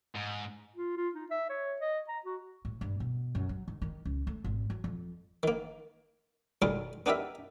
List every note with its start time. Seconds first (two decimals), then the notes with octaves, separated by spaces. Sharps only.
0.15 G#2
0.76 F4
0.97 F4
1.15 D#4
1.31 E5
1.49 C#5
1.81 D#5
2.08 A#5
2.25 F#4
2.65 A2
2.81 G2
3.00 B2
3.35 F#2
3.49 F#3
3.68 D#3
3.82 D#3
4.05 C#2
4.27 A3
4.44 G#1
4.70 F#3
4.84 F2
5.43 D#3 A#3
6.62 B1 D#3 G3 G#3 A#4 D6
7.06 B3 D4 D#4 G4 A#4 E5